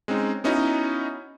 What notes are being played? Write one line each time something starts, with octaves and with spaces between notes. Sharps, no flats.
G#3 C4 C#4 D#4
B3 C#4 D#4 E4 F#4 D#5